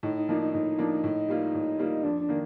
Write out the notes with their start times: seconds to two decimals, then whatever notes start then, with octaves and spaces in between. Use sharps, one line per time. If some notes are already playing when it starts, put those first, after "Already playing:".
0.03 A2 D#4
0.17 D#4
0.29 F3 A#3 D4 D#4
0.42 D#4
0.53 A2 D#4
0.79 F3 A#3 D4
1.04 A2
1.29 G3 A#3 F4
1.54 A2
1.79 G3 A#3 F4
2.03 F2 D4
2.21 D4
2.29 D#3 A#3